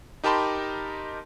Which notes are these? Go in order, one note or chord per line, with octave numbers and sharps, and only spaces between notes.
D#4 G4 A#4 A5 B5 C6